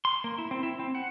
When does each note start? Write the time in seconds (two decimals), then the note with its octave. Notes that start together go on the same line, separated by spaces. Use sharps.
0.05 C6
0.24 A#3
0.38 E4
0.51 C4
0.63 E4
0.79 C4
0.95 F#5